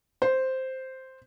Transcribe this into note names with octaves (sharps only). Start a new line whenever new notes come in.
C5